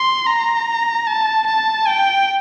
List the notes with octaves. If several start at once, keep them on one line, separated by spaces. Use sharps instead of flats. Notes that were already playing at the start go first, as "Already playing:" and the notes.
Already playing: C6
A#5
A5
A5
G5